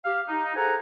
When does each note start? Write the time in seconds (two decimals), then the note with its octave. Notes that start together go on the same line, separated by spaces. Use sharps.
0.05 G4 F5
0.28 D#4
0.55 G#4 A4 C5 F#5 G#5 A#5